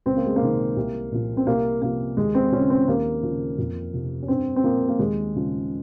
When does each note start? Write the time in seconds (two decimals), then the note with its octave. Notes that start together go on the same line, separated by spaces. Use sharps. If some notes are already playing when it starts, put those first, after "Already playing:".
0.06 C#2 C4
0.16 A#3
0.26 G#3
0.36 A#3
0.41 C3 D#3
0.77 C2
1.12 A#2 F3
1.37 C4
1.47 C2 A#3
1.82 C3 F3 A#3
2.17 D#2 G#3
2.35 C4
2.52 C#3 F3 C#4
2.70 C4
2.88 D#2 A#3
3.23 C#3 F3
3.58 F2
3.93 C3 F3
4.23 C#4
4.28 G2 C4
4.56 C4
4.64 F3 A#3
4.88 A#3
4.99 D#2 G#3
5.34 C#3 F3